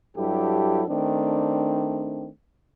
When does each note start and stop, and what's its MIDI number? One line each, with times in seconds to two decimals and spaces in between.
0.16 0.83 43
0.16 0.83 54
0.16 0.83 64
0.16 0.83 67
0.16 0.83 69
0.88 2.28 51
0.88 2.28 57
0.88 2.28 60
0.88 2.28 62